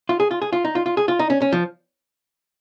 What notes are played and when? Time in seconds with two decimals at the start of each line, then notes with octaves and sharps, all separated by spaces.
0.09 F4
0.20 G#4
0.31 F4
0.42 G#4
0.53 F4
0.65 D#4
0.75 F4
0.86 F4
0.97 G#4
1.08 F4
1.19 D#4
1.30 C#4
1.42 C#4
1.53 F3